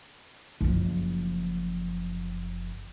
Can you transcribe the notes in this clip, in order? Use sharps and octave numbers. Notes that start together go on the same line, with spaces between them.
F#1 F3